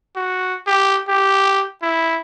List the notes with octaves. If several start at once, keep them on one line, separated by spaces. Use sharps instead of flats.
F#4
G4
G4
E4